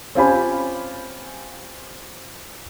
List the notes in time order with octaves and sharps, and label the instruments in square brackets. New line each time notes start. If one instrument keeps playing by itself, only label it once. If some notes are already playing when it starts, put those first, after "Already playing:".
[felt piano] C4 C#4 F4 G4 G#5 B5